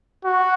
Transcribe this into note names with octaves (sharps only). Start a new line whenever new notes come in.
F#4